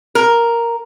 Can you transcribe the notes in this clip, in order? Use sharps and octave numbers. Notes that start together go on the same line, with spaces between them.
A#4